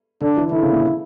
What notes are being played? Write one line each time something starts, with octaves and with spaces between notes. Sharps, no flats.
D3 D4
E3
D3 E4
C#3
A#2